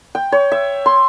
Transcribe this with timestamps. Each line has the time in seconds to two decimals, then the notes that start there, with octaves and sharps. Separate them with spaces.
0.15 G5
0.32 C#5
0.52 E5
0.86 C6